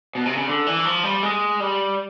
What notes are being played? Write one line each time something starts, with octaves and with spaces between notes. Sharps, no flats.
B2
C3
C#3
D3
E3
F3
G3
G#3
G3